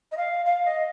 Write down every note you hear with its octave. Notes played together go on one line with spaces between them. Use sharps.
D#5
F5
F5
D#5